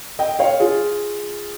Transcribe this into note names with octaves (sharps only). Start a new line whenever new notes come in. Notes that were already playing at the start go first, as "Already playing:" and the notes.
D#5 G5
C#5 F5
F4 G#4